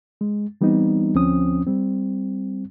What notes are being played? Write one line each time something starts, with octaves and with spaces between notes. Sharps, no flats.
G#3
E3 G3 B3 C4 D#4
D2 F3 C4 C#4 D#6
G3 C4